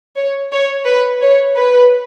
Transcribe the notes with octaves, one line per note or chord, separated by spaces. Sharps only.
C#5
C#5
B4
C#5
B4